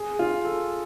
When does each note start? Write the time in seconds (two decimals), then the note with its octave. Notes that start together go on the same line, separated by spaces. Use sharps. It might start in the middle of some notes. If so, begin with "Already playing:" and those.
Already playing: G#4
0.19 F4
0.45 A4